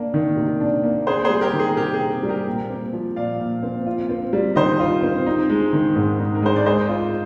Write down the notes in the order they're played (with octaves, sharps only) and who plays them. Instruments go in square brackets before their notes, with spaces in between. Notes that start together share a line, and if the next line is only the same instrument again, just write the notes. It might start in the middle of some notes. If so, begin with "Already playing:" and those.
Already playing: [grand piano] A#3 D4
D#3
C3
D4
A#3
[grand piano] C4 [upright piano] G#4 C5
[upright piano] G#4 C5
[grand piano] G3
[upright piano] G4 A#4
[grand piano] D#3
[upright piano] G#4
[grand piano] C3 [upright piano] G4 A#4
[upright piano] G#4
[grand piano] C4
G3
[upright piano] G4 A#4
[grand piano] A#2
C4
F3
[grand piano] A#2 [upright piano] D5 F5
[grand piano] A#2
C4
F4
C4
G3
[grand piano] D#3 [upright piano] C5 D#5
[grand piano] F4
C4
D#4
G#3
D#3
G#2
D#4
[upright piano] A#4
[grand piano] G#3 [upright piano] C5
[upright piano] D5
[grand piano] G#4 [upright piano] C5 D#5
[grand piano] F4